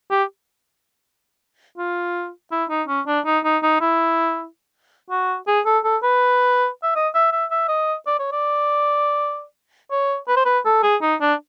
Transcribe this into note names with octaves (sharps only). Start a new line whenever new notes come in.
G4
F4
E4
D#4
C#4
D4
D#4
D#4
D#4
E4
F#4
G#4
A4
A4
B4
E5
D#5
E5
E5
E5
D#5
D5
C#5
D5
C#5
B4
C5
B4
A4
G#4
D#4
D4